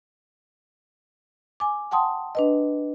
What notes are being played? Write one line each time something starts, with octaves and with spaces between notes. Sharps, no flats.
G#5 D6
F#5 G5 A5 C6 D#6
D4 B4 D#5